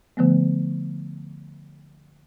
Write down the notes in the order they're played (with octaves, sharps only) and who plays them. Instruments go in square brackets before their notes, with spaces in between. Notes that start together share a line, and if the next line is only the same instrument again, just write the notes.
[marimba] D3 F3 A3 B3